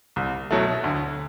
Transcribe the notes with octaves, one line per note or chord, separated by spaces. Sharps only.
C2
B2 F#3 A3
D2